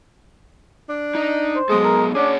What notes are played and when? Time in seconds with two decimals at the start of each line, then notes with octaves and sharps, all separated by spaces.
0.89 D4
1.15 D#4 D#5
1.56 C5
1.70 F#3 G#3 B3 A4
1.84 A#4
2.15 C#4 D4 G#4 C#5 F#5